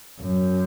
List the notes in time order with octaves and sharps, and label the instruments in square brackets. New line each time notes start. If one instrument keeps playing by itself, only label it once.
[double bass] F#2